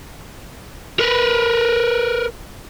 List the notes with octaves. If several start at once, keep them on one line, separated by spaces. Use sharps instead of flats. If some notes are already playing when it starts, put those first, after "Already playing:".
A#4 B4